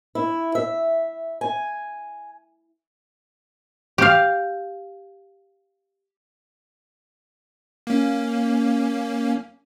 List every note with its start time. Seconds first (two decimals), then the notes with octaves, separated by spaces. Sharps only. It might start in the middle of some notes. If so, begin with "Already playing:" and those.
0.15 E4
0.55 E5
1.41 G#5
3.98 G4 F5
7.87 A#3 C#4